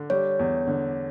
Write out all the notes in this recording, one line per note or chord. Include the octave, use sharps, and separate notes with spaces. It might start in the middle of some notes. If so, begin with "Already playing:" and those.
Already playing: D3
G3 C#5
E2
D3